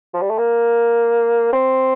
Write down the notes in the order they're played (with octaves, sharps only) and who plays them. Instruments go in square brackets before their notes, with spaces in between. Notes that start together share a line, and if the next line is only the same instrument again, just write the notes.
[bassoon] F3
G3
A3
A#3
C4